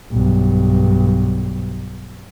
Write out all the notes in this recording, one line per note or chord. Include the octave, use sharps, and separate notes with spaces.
B1 G2